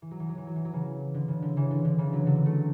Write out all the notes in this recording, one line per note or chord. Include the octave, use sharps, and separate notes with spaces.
E3
F#3
E3
F#3
E3
F#3
E3
F#3
C#3 E3
D3
C#3
D3
C#3 E3
D3
D3
C#3 E3
D3 F#3
D3 F#3
F#3 A3